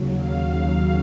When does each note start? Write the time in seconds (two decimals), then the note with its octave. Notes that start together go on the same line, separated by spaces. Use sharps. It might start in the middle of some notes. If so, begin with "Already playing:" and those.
Already playing: D#2 C#3 F#3
0.14 F5